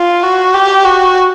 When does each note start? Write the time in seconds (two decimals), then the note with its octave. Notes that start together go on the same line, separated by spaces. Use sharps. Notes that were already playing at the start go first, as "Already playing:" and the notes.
Already playing: F4
0.23 F#4
0.54 G4
0.85 F#4